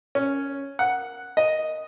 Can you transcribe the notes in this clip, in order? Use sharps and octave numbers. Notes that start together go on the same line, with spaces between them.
C#4
F#5
D#5